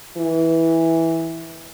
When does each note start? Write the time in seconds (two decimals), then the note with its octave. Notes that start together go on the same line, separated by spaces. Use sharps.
0.17 E3